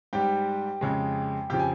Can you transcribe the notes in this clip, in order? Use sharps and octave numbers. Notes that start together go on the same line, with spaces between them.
G#2 G3 G4 G5
F2 C#3 G#3
F2 C#3 F3 G4 G5
G#5